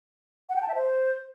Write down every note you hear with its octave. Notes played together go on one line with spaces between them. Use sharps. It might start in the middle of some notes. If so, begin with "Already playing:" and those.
F#5
G5
A5
E5
C5